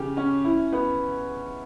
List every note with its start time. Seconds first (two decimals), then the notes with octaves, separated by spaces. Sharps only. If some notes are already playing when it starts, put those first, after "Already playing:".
Already playing: C#3 G4
0.17 C#4
0.44 E4
0.73 B3